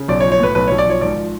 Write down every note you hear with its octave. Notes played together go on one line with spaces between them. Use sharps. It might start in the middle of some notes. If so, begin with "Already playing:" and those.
Already playing: C#3
B1 D5
C#5
F3
C#5
A2 B4
B1 B4
B1 C#5
D5
F3 C#5
G#1 D5
F3